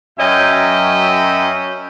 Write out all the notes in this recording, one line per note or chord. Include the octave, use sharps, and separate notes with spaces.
F#2 F#3 C#4 D#5 E5 G5